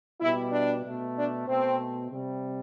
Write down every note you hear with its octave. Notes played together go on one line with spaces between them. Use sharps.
B2 G3 E4
D4
B2 A3
D4
B2 A3 C4
C3 G3